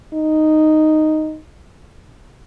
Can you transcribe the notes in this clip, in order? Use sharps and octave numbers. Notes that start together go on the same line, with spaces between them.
D#4